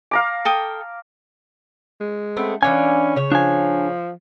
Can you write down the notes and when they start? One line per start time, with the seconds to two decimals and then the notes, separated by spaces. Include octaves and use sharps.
0.11 F5 A#5 D6
0.45 A4 G5 D#6
2.01 G#3
2.37 A3 B3 C4
2.63 E3 C#4 D4 F5 G#5
3.16 C#3 C#5
3.32 F3 D4 G#5